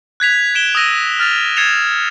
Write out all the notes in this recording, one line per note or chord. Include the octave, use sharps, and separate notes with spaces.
F#6 G#6 B6 F7
G#6 D7 E7 G7
D#6 E6 A#6 D#7
F6 A6 F7
G#6 A6 C7 C#7 E7 F7